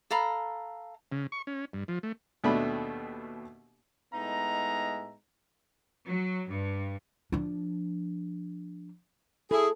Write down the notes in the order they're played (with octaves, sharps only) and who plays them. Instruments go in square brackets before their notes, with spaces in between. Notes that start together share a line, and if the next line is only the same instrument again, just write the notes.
[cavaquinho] A4 F5 A#5 B5
[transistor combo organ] C#3
C#6
C#4
G2
F3
A3
[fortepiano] D#2 B2 A3 D4 B5
[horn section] A2 G#3 B3 D#4 E5 A#5
[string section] F#3
G2
[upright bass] F3 D4
[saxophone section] E4 G#4 [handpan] A4